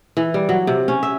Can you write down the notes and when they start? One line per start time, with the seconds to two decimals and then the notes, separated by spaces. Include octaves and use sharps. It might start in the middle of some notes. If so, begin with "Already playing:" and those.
0.17 E3
0.34 G3
0.49 F#3
0.67 C3
0.88 C#4
1.03 E5